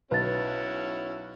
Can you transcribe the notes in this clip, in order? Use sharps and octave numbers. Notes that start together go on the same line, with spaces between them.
B1 C#4 E4 F#4 B4 A6